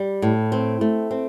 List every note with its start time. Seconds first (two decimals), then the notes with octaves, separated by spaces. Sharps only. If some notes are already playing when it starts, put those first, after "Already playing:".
Already playing: G3
0.22 A2
0.52 C4
0.81 A3
1.11 C4